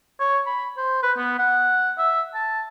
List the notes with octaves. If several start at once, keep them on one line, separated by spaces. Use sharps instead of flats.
C#5
B5
C5
B4
B3
F#5
E5
A5